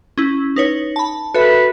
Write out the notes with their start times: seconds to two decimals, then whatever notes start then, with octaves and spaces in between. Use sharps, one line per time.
0.18 C#4 E4
0.56 D#4 B4 C#5
0.96 A5 B5
1.34 F#4 A4 B4 E5